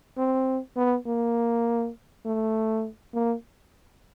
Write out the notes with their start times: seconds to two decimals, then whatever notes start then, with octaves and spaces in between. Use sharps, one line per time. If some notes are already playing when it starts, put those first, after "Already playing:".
0.18 C4
0.76 B3
1.06 A#3
2.26 A3
3.14 A#3